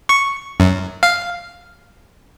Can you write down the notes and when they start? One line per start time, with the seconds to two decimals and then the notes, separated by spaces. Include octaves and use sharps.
0.09 C#6
0.60 F#2
1.03 F5